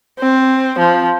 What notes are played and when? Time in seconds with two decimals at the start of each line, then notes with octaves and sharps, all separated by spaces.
0.19 C4
0.79 F3